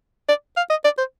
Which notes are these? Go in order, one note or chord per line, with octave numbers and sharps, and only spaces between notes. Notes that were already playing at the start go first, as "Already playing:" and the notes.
D5
F5
D#5
D5
C5